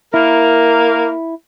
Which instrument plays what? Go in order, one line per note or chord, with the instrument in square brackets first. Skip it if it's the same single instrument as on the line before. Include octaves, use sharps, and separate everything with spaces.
[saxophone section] A#3 A#4 [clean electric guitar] E4